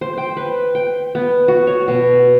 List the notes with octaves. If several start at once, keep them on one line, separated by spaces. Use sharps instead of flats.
C5
G5
B4
G5
B3
F#4
C#5
B2